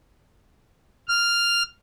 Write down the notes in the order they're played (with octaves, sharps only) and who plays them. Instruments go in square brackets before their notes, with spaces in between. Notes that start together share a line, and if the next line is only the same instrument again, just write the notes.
[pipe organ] F6